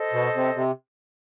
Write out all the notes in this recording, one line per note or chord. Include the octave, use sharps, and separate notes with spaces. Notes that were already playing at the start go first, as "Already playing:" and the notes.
Already playing: A4 C5 D#5
B2
C3
C3